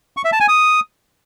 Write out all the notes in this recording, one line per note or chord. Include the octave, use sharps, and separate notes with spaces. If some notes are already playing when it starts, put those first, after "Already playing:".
C#6
E5
A5
G#5
D#6